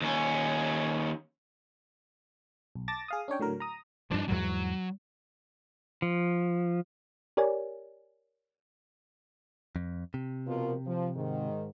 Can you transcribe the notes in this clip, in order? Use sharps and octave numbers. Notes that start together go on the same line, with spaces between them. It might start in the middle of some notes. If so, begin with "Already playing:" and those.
D#2 C#4
B1
A5 D6 A6 A#6
G#4 F5 D#6
C#4 D4 C#5 G5
A2 D3 F#3 A#4
A#5 D#6
G2 F3 D4 D#4
E2 G#2 F#3 G3
F3
G4 A#4 C#5 D5 G#5
F2
C3
B2 F3 A#4
F3
G#2 D#3